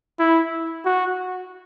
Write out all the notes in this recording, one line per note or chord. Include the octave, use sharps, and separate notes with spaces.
E4
F#4